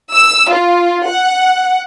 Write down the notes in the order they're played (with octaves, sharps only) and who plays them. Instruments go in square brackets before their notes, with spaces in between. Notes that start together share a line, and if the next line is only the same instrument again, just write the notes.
[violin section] E6
F4
F#5